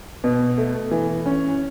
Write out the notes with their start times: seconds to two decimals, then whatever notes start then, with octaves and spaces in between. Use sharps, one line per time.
0.24 B2
0.58 A3
0.91 E3
1.26 C#4